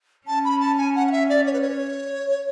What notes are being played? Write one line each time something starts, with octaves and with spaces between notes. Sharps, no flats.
C#4 A5
B5
A5
G#5
F#5
F#5
E5
D5
C#5
B4
C#5